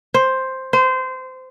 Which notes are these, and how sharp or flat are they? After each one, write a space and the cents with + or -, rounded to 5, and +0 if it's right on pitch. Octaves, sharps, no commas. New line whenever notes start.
C5 +5
C5 -20